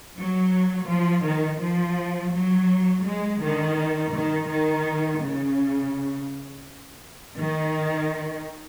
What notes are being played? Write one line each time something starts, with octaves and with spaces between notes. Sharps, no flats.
F#3
F3
D#3
F3
F#3
G#3
D#3
D#3
D#3
C#3
D#3